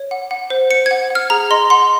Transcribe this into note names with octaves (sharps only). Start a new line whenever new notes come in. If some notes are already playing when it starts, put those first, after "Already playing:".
Already playing: C#5
F#5
F#5
C5
C5 C#7
G#6
F#5
F#5 F6
G#4 A#5
D#5 C6
F#5 C6